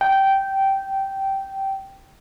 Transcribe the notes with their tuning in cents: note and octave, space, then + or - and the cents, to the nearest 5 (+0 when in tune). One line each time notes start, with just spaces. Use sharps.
G5 -10